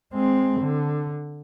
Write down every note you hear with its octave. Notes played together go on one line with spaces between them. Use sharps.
G#3 C4
D3